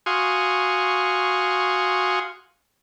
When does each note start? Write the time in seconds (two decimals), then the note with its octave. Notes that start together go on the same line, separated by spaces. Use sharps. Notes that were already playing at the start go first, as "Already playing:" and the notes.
0.06 F#4 F5 G#5 C6 C#6 D#6